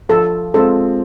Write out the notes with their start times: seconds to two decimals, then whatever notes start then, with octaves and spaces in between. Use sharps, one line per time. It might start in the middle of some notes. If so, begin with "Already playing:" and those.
0.09 F3 A4
0.54 G#3 C4 F4 A4